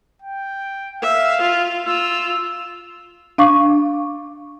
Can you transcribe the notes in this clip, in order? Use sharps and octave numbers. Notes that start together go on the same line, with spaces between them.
G5
E5 F5
F4
F4 E6
D4 F5 C#6 D6